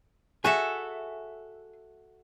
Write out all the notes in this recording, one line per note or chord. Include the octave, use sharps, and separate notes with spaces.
F#4 G#4 A4 E5 G#5